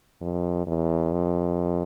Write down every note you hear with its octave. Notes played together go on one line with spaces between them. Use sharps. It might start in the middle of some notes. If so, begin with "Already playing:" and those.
F2
E2
F2